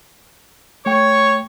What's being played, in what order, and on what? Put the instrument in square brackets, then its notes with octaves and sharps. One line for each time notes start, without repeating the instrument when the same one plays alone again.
[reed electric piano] A3 G5 [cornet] C#5 [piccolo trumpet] C#6